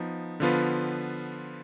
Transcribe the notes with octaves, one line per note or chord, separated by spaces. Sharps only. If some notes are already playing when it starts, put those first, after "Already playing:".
Already playing: F3 B3 D#4
D3 F3 B3 F4 B4